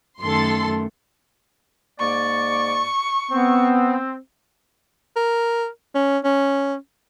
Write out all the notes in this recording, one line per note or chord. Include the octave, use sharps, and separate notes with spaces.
F#2 D#3 A3 A4 C6
G#2 A#3 D5 C#6
B3 C4
A#4
C#4
C#4